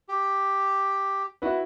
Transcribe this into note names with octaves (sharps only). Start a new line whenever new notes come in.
G4
E4 F#4 B4